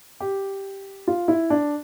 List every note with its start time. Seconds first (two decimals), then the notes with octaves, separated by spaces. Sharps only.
0.20 G4
1.08 F4
1.28 E4
1.50 D4